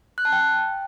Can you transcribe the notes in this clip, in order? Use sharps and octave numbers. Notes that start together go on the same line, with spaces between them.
F#6
A5
G5